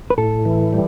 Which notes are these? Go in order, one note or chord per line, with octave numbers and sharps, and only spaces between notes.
B4
A2 A4
E3
G3